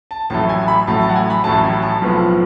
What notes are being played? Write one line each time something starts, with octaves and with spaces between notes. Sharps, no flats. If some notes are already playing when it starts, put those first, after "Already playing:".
A5
A1 A2 F#3 A3 A5
G#5
B5
A1 A2 F#3 A3 A5
A5
F#5
G#5
B5
A1 A2 F#3 A3 A5
G#5
A5
B1 A2 F3 B3 F4